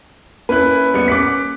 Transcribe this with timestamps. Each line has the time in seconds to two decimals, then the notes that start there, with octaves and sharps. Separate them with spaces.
0.49 A#3 C#4 E4 B4 F#6
0.94 G3 B3 C#7
1.08 A#3 C#4 D6 F#6 B6